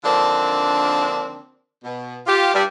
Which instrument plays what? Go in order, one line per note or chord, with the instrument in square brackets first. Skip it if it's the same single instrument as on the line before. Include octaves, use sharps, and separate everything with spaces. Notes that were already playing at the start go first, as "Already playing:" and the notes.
[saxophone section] D3 D#3 F3 A#3 C4 D4
B2
F4 G4
G2 G3